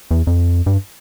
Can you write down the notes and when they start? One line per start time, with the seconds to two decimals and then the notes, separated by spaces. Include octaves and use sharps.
0.11 E2
0.27 F2
0.66 G2